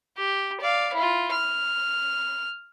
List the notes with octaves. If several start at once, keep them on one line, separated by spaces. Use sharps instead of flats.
G4
D5 F5
E4 F4
F6